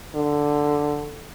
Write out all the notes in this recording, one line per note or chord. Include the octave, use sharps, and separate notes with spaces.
D3